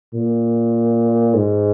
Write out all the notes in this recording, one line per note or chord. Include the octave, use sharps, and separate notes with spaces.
A#2
G#2